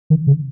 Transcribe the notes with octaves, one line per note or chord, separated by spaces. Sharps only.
D#3
C#3